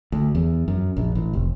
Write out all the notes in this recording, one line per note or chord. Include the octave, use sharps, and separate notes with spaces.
D2
E2
F#2
A#1
A1
F1